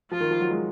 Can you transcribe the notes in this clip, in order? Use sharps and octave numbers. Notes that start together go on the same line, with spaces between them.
F3 F4
D#3
F3
F#3
G#3